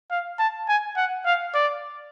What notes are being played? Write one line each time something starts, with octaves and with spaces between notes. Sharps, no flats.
F5
A5
G#5
F#5
F5
D5